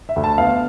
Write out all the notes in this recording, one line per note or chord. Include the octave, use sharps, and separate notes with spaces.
E5
D2
A5
B3 F5